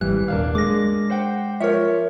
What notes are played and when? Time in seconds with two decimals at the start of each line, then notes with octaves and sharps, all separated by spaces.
0.01 G#1 E3 G3 F#6
0.28 D#1 A#3 D4 F5
0.55 G#3 D6 A#6
1.10 C5 F#5 G5
1.60 F3 A#4 C#5 E5